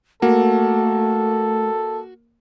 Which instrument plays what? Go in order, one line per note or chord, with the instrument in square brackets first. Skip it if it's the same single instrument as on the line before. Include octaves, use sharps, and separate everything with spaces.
[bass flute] A3 [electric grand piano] A#3 [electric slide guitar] F#4 [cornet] A4